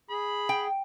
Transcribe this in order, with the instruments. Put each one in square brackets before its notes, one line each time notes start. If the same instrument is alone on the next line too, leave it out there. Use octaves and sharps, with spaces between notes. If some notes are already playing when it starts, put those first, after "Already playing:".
[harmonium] G#4 [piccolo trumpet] B5
[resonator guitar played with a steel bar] G5